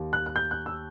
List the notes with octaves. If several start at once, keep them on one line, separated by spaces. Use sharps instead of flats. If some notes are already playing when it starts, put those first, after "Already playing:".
Already playing: D#2
F#6
F#6
G6
F#6
E6